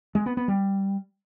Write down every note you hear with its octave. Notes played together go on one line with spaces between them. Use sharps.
G#3
B3
B3
G3